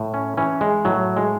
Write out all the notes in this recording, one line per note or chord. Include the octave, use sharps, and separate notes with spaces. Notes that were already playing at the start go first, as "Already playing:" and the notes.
Already playing: A2
C#4
E3 C#4
G#3
A2 F#3
G#3